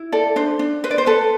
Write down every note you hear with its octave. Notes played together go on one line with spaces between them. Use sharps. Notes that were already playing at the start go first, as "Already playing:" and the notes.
Already playing: E4
A4 D5
D4 C5
D4
B4 C5
D5
C5
A4 B4